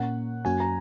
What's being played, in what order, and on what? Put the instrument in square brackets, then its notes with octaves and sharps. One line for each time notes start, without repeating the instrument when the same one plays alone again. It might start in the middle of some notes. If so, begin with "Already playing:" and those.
Already playing: [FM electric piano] A#2 A#3 C#4 [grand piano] F#5
[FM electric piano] F#2 F#3 A#3 C#4 F#4 [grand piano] G#5
[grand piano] A#5